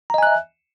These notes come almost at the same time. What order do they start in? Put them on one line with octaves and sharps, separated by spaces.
A#5 D#5 G#5 F#6 E5